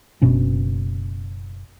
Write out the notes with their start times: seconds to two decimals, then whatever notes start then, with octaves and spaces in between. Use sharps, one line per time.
0.22 F#1 B2 C#4 D4